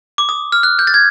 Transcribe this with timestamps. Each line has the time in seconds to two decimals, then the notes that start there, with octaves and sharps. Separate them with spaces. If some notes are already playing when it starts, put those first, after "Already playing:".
0.18 D6
0.29 D#6
0.52 F6
0.63 F#6
0.79 G6
0.87 A6
0.94 G#6